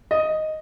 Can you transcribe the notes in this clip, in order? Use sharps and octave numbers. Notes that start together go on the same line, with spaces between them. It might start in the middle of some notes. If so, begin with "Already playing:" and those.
D#5